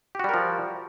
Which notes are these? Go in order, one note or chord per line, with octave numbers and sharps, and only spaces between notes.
F3 G3 F#4 G4 A#4